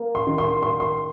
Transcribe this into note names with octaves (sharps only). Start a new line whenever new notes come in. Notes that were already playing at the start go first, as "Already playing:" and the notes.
Already playing: A#3
C6
D#3
C6
A#3 C6
C6